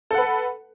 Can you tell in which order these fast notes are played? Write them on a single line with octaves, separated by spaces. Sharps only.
A4 F#5 B4